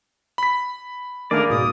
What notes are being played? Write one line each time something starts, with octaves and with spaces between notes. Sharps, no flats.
B5 B6
D#3 A3 A#3 D4 G#4 A#4 D5
G#2 B2 D#6